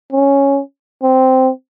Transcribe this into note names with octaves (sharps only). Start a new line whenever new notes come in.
C#4
C4